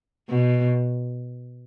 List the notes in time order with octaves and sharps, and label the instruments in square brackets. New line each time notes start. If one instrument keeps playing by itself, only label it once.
[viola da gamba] B2